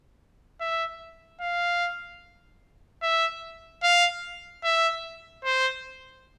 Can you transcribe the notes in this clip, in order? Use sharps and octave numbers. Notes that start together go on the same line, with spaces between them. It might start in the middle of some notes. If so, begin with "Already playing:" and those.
E5
F5
E5
F5
E5
C5